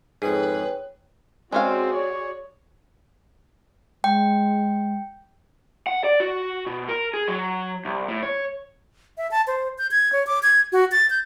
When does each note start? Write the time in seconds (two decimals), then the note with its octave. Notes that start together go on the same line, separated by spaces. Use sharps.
0.22 F2 G#2 G#4 B4 C#5 G5
1.52 G#3 C4 C#4 F#4 G#4 D5 F5
1.93 C#5
4.04 G#3 G5
5.87 F#5
6.04 D5
6.20 F#4
6.67 B2
6.89 A#4
7.14 G#4
7.28 F#3
7.85 C2
8.08 A2
8.23 C#5
9.18 E5
9.31 A5
9.47 C5
9.78 G6
9.91 G#6
10.13 C#5
10.27 D6
10.43 G#6
10.72 F#4
10.92 A6
11.10 G6